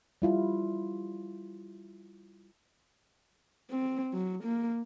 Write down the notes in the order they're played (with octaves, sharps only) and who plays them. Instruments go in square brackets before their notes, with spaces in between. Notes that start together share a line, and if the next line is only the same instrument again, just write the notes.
[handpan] G3 E4 F4
[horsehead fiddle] C4
F#3
A#3